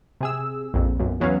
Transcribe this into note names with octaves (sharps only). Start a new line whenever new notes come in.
C3 G#4 E6
A#1 F2
B1 F#2
E2 F#3 B3 C#4 F5